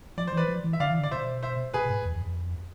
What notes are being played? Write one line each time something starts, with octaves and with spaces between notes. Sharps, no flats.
F3 D5
C5
E3 B4 D5
F3
E3
E5
D3 D5 F5
E3
D3
D5
B2 C5 E5
C5 E5
B2 G#4 B4
G#2
E2
F2
F2